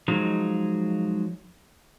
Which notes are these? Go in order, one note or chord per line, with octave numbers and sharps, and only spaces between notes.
F3 F#3 G#3 D#4